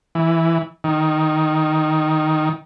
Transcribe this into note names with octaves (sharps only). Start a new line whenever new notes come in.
E3
D#3